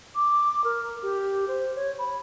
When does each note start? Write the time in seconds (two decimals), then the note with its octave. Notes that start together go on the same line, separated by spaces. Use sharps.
0.15 D6
0.64 A#4
1.02 G4
1.48 C5
1.76 C#5
1.99 B5